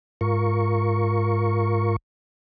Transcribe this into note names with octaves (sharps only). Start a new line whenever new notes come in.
G#2 F4 A#4 C#6